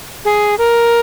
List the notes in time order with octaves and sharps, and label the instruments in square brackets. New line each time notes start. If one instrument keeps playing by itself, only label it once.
[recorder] G#4
A#4